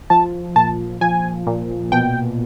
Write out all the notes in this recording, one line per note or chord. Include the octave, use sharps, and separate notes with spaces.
F3 A5
A#2 A5
F3 G#5
A#2
B2 G5